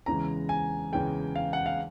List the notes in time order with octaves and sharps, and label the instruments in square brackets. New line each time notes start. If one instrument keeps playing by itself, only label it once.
[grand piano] E2 C#3 E3 G#3 A#5
G#5
E2 C#3 E3 G#3 G5
F5
F#5
F5